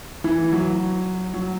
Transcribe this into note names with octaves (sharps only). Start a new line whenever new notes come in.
E3
F#3
F#3